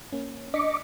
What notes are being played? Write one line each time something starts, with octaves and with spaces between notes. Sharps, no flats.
A#3 C#4
D4 D#5 D6 B6 C#7